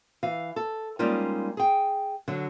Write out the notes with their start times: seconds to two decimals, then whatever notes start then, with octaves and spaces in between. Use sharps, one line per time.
0.23 E3 F5
0.56 A4
0.99 G3 G#3 A#3 C#4 D#4 F4
1.57 G#4 G5
2.28 D3 F#3